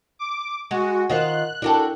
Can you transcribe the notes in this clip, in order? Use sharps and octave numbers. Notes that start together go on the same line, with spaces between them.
D6
G#3 F#4
D#3 F4 A#4 C5 D#5 F#5 F#6
D4 E4 F#4 A4 A#4 G5